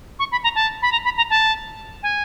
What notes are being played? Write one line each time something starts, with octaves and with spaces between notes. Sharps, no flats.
C#6
B5
A#5
A5
B5
A#5
B5
A#5
A5
G#5